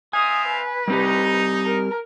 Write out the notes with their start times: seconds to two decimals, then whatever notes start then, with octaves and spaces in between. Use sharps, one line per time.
0.13 C4 E5 F5 G#5 D#6
0.47 B4
0.88 G3 C4 D#4 G4
1.65 A#4